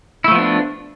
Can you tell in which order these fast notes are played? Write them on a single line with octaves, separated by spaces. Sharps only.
E4 A3 F3 B3 D4